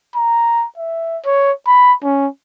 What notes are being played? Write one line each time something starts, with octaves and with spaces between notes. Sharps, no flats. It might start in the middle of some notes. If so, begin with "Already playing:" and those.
A#5
E5
C#5
B5
C#4